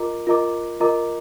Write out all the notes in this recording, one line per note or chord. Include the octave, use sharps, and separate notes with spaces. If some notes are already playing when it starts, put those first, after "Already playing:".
Already playing: F4 A#4 D#5 A#5 D6
F4 A#4 D#5 A#5 D6
F4 A#4 D#5 A#5 D6